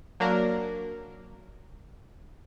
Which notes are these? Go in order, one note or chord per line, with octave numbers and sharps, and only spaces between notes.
F#3 A#3 D4 A#4